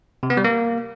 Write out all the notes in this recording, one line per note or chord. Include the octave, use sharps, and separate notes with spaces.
C3
B3
G3
A#3